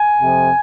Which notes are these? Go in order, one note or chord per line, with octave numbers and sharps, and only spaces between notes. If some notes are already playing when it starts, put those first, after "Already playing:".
Already playing: G#5
F2 C3 F3